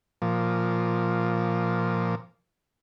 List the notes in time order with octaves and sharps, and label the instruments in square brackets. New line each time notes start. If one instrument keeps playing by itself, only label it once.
[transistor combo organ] A#2 F3